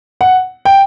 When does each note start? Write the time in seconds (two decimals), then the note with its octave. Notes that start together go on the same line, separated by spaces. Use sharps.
0.21 F#5
0.65 G5